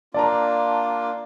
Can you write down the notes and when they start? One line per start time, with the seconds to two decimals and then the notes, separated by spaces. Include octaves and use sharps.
0.14 A#3 D4 F4 D5 A5 A#5